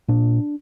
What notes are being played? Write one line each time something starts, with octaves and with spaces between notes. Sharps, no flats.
A#2 D4